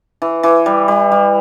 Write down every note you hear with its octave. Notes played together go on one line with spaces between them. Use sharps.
E3
E3
G3
G3
G3